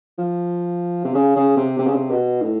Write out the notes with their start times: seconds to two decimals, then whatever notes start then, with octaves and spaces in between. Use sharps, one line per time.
0.19 F3
1.05 C3
1.15 C#3
1.36 C#3
1.57 C3
1.79 C3
1.87 C#3
1.95 C3
2.11 B2
2.42 A2